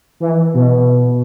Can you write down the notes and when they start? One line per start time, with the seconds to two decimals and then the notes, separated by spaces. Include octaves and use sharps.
0.20 E3
0.54 B2